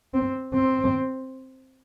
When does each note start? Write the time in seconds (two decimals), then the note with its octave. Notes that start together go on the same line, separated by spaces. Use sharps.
0.14 C4
0.54 C4